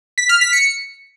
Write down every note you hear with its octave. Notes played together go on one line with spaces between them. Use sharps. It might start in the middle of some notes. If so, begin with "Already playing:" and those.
B6
F6
B6
C#7